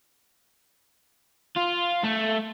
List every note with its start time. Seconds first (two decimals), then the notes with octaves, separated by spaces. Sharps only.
1.56 F4
2.04 A3